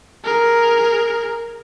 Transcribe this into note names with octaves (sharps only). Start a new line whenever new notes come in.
G#4 A#4